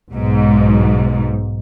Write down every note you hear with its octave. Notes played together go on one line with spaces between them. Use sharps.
B1 G#2